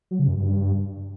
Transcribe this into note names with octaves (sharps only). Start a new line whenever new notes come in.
F#3
C#3
F#2
G2